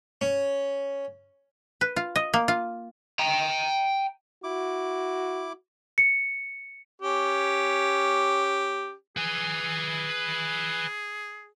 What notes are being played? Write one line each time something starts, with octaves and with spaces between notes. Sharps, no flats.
C#4
B4
F4
D#5
A#3
F4
G5 A#5
E4 F#4 D6
C#7
C#4 G4
G#4 B4 G#5